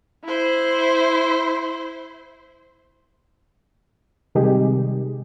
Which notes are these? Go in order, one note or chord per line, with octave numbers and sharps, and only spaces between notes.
E4 C5
C3 D#3 G3 G#3 G4 G#4